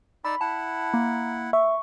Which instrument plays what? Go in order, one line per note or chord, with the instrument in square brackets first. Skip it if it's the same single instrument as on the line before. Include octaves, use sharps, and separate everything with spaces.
[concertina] D#4 D5 E6 [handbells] B5
[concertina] E4 F#5 [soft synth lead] A5
[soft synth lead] A#3 [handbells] A#5
[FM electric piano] E5 [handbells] C#6